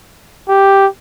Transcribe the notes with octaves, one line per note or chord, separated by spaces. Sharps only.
G4